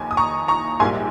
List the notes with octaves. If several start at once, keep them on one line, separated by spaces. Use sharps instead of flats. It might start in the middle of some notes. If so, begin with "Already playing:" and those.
Already playing: F1 D#2 D#3 G#5
D#6
A#5 C#6
A#5 C#6
A#1 G#2 G3 A#3 G#5 C6